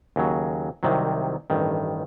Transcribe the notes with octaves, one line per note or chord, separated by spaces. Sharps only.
D#2 C#3 F#3
C2 C3 D#3 F#3
A1 G2 D#3